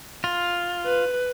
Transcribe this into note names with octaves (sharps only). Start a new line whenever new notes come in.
F4
B4